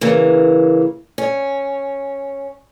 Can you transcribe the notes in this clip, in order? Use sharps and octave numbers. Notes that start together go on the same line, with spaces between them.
C#3 E3 A#3
C#4